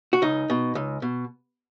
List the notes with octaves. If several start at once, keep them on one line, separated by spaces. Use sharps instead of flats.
F#4
C#2 D#4
B2
C#2
B2